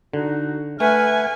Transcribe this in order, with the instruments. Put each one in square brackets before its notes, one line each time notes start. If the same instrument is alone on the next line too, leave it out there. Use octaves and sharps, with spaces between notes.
[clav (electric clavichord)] D3 [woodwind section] D#4 F#4
[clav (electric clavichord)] A3 [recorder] B4 [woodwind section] E5 F#5 F6 [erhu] G#5